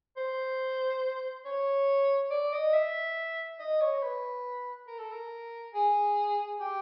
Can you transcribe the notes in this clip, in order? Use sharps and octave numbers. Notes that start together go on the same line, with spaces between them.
C5
C#5
D5
D#5
E5
D#5
C#5
B4
A#4
A4
A#4
G#4
G4